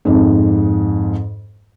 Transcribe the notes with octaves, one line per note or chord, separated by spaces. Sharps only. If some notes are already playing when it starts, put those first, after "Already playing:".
F2 G#2